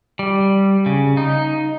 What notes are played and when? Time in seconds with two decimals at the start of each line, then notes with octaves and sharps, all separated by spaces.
0.19 G3
0.86 C#3
1.17 D#4